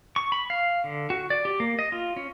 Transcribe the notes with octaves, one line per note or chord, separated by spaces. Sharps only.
C#6
B5
F5
D3
F#4
D5
G4
A#3
D#5
F4
C#4